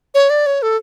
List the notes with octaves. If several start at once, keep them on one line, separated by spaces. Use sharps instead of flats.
C#5
D5
C#5
A4